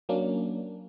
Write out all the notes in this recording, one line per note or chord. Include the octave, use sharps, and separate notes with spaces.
F#3 A#3 C#4 D4